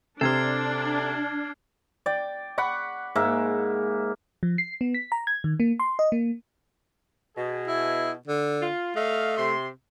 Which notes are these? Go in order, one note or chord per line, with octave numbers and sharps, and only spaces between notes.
C3 D4 A4 C5 F6 G#6 C7
D5 G5
F#5 B5 C#6 D6
G#2 A#3 E5
F3
C7
B3
B6
A#5
G#6
D#3
A#3
C6
D#5
A#3
B2 G#4
E4
D3
F4
A3 D#5 F5
C3 C6